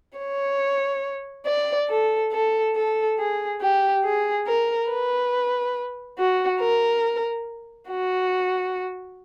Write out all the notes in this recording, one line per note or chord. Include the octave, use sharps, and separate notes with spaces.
C#5
D5
A4
A4
A4
G#4
G4
G#4
A#4
B4
F#4
A#4
F#4